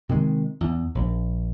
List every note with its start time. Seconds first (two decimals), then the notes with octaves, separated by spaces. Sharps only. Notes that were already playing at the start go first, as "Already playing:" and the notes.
0.09 C3 D#3 G#3
0.61 E2
0.95 A#1